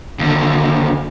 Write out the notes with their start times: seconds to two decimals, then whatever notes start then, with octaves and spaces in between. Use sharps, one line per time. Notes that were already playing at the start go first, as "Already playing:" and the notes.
0.19 D#2 D3